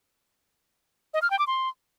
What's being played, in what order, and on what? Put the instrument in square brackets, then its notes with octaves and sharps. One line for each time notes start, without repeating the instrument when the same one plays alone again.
[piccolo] D#5
F6
G5
D6
C6